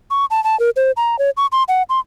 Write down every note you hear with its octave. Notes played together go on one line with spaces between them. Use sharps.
C#6
A5
A5
A#4
C5
A#5
C#5
C#6
C6
F#5
C6